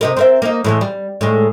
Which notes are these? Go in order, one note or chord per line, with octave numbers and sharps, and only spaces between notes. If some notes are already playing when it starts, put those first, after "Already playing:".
C3 D#4 A#4
C4 A#4 E5
A#3 D#4
A2 E3 G#3
G3
A2 D#3 G#3